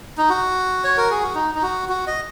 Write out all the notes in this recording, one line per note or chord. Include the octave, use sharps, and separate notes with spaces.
D#4
F#4
C#5
A#4
G#4
F#4
D#4
D#4
F#4
F#4
D#5